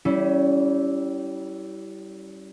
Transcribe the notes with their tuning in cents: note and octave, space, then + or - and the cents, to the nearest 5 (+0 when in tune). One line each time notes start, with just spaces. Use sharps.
G3 -20 C#4 +15 E4 +0